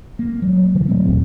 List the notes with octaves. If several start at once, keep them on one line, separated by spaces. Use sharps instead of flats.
A#3
F#3 G#3
B2 D3 E3 G3
A#2 F#3 A3 C4
D#1 G#1 E2 F3